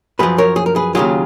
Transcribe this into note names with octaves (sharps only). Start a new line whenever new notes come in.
F#2 F3 G#4 B4
A#4 C#5
G#4
A#4
G#4 B4
D#2 C#3 F#3 F4 G#4